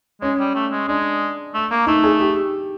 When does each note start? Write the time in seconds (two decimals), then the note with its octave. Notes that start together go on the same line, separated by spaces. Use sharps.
0.22 G#3 C#4
0.39 G3
0.55 A3
0.72 G#3
0.88 G#3 D4
1.54 A3
1.71 A#3
1.87 A3 D#4
2.04 G#4
2.20 G4